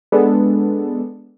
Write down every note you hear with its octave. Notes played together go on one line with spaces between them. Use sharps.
G#3 B3 D4 A4